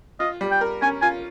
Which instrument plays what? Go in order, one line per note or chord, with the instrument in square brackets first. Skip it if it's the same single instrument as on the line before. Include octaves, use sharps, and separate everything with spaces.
[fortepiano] F4 [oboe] D#5
[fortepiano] G3
[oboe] G5
[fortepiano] A#4
[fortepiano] C#4 [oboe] G#5
[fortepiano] F4 [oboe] G#5